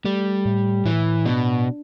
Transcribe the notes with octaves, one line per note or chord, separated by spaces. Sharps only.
G3 A3
A2
A2 E3
B2 D4